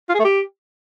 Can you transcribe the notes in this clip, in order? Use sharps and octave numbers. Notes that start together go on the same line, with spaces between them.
F4
G#4
A3
G4